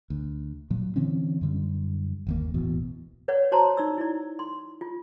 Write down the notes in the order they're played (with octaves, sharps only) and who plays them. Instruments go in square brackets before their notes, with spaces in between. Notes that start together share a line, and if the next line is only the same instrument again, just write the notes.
[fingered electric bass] D2
A#2 F#3
D3 E3 C4 C#4
F#2 D3 G3
G1 D#2 A#3
D1 A1 E2 B2
[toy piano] B4 C#5 D5 F#5
F#4 C5 C#5 A5 A#5 C6
D#4 D5 E6
E4 D5
C6
F4